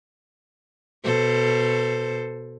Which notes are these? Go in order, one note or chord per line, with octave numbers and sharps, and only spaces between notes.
B2 A4 C5